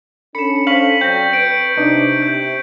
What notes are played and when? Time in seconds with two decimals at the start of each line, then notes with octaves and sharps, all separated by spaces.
0.35 C#4 D4 A4 B5 C#7 E7
0.67 C5 F5 C#6 B6 F#7
1.01 F#3 C4 D5 G5 G6 A#6
1.33 B4 D7
1.77 C3 D4 D#4
2.22 C3 G6